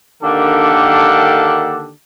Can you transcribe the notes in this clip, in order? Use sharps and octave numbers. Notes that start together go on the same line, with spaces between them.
D3 D#3 A#3 D4 G4 A4